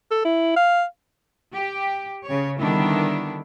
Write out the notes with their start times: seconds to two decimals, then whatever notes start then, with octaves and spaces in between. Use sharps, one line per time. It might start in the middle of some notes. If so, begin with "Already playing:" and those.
0.11 A4
0.25 E4
0.56 F5
1.52 G4
2.27 C#3 C#5
2.59 D3 D#3 G3 B3 D4 E4